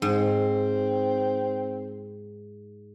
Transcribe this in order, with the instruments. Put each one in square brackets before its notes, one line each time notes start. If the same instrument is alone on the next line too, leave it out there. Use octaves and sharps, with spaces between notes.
[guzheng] G#2 [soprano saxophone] C4